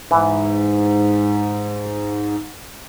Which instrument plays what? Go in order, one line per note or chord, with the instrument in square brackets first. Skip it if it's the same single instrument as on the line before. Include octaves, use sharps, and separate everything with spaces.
[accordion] G#2 [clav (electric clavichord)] E3